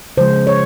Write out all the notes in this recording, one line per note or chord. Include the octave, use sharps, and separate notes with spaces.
C#3 F3 G#3 C5
C#5